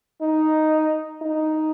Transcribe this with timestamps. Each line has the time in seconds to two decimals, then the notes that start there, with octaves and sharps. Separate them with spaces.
0.21 D#4
1.22 D#4